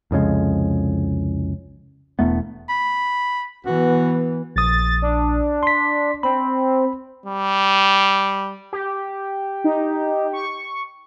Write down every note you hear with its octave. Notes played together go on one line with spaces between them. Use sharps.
C2 F2 C#3 G#3
E1 E2 A3 B3
B5
E3 B3 F#4
A#1 D#6 A6
D4
C6 B6
C4 B5
G3
G4
D#4
C#6